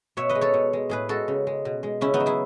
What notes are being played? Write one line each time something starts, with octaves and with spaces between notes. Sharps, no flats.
B2 C#5 E5
B4 D#5
G#3
A4 C#5
B2
G#3
A2 G#4 B4
G#3 F#4 A4
C#3
G#3
B2
G#3
C#3 C#4 E4
B3 D#4
F#3
E4 G#4